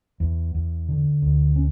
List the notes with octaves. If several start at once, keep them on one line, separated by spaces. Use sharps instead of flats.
E2
E2
D3
D2
C#4